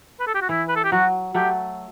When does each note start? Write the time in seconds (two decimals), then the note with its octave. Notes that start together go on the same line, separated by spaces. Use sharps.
0.20 B4
0.27 A4
0.34 G4
0.42 F#4
0.49 E3 E4
0.68 B4
0.76 A4
0.84 G4
0.92 F#3 F#4
1.34 F#3 A3 G4